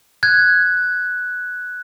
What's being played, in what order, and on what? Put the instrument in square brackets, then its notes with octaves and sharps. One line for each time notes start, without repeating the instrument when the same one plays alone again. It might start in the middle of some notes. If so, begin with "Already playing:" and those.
[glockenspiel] F#6 G#6